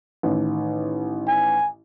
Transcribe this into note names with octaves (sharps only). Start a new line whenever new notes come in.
A1 D#3
G#5